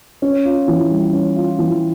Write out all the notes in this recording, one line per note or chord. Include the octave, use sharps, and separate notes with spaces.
C#4
F4
E3
G3
C#4
F4
E3